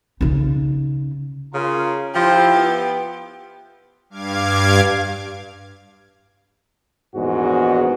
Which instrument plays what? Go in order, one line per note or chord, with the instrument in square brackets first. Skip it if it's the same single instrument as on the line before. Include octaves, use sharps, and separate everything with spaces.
[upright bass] C#3 D#4
[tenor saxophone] C#3 [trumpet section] F4 A#4 A#5
[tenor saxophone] F3 [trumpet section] E4 F4 [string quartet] G4
[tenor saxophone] B3
[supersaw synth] G2 F5 D6 G#6
[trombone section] A#1 E2 G#2 B3 F#4